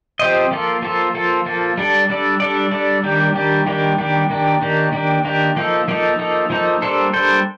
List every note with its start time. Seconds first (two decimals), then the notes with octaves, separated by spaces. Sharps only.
0.19 F3 C4 G4 C5 D#5
0.51 F3 A#3 F4 A4
0.82 F3 A#3 F4 A4
1.14 F3 A#3 F4 A4
1.46 F3 A#3 F4 A4
1.78 G3 D4 A4 D5
2.09 G3 D4 A4 D5
2.40 G3 D4 A4 D5
2.71 G3 D4 A4 D5
3.03 D#3 G3 A#3 D4 G4
3.35 D#3 G3 A#3 D4 G4
3.66 D#3 G3 A#3 D4 G4
3.98 D#3 G3 A#3 D4 G4
4.30 D#3 A#3 D4 G4
4.62 D#3 A#3 D4 G4
4.92 D#3 A#3 D4 G4
5.25 D#3 A#3 D4 G4
5.56 F3 A#3 D#4 A4
5.88 F3 A#3 D#4 A4
6.19 F3 A#3 D#4 A4
6.50 F3 A#3 D#4 A4
6.82 G3 A#3 D4 A4 C5
7.13 G3 A#3 D4 A4 C5